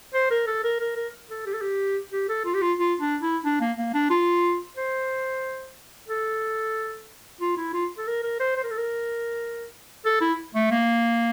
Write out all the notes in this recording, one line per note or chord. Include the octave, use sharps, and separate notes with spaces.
C5
A#4
A4
A#4
A#4
A#4
A4
G4
A4
G4
G4
A4
F4
G4
F4
F4
D4
E4
D4
A#3
A#3
D4
F4
C5
A4
F4
E4
F4
A4
A#4
A#4
C5
C5
A#4
A4
A#4
A4
E4
A3
A#3